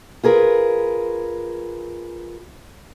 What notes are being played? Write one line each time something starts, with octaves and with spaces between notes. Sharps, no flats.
F4 G#4 A#4 B4